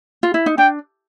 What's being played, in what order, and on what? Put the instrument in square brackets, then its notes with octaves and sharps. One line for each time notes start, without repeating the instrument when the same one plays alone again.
[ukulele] F4
E4
D#4
[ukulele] D4 [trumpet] G5